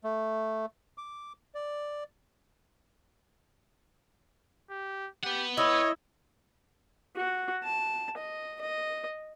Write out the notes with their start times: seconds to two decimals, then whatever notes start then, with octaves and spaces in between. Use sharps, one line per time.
0.04 A3
0.98 D6
1.55 D5
4.70 G4
5.24 G4 B4 F#5
5.57 E4 C#5 D#5
7.16 F#4
7.64 A5
8.17 D#5
8.61 D#5